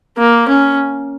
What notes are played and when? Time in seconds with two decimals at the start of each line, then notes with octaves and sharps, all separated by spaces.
0.18 A#3
0.49 C#4